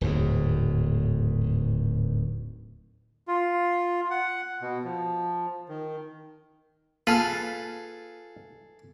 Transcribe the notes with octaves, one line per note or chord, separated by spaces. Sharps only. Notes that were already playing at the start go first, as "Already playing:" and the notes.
D1 D#2 G#2
F4
F#5
B2
F3
D#3
A#3 F4 G#4 A4 B4 A5 F6